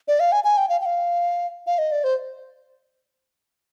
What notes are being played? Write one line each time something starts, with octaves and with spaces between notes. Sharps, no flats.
D5
F5
G#5
G#5
G5
F5
G5
F5
F5
D#5
D5
C5